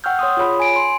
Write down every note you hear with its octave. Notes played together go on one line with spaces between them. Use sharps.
F#5 G5 C#6 E6 F6 G6
C#5 C6 D#6
F4 G#4 C#5 B5
G#5 D7
C6